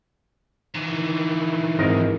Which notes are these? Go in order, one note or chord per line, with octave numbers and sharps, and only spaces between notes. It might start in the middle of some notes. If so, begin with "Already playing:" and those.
D#3 E3
G#1 A#4 D#5